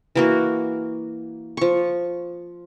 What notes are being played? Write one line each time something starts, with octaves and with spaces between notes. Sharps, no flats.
E3 A#3 F#4
F3 C#6